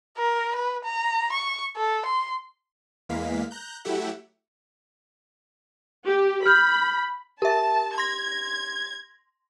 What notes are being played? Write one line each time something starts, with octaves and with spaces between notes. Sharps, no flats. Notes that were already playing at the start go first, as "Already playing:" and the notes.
A#4
B4
A#5
C#6
A4
C6
E2 E3 G#3 A#3 F5 B6
A#5 F#6 G6
F#3 A3 E4 G4 E5 F#5
G4
B5 F6 G6
G4 A#4 E5 A5
C6 G#6 A#6